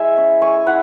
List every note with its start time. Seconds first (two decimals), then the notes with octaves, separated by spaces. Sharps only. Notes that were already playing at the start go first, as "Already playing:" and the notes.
Already playing: G#3 E4 E5 G#5
0.17 C#4
0.41 G#3 G#5 C#6
0.66 E4 F#5 B5